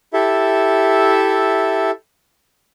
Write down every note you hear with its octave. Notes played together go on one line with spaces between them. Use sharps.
E4 G4 A4 E5